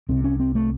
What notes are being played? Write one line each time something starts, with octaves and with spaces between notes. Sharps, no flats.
C2 C3 C4
C#4
C4
A3